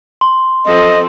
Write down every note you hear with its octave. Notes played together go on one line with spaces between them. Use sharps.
C6
F3 C4 A4 D#5